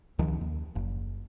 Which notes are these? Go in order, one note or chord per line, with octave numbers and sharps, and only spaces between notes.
C#2 D#3 F3
D#2
F#1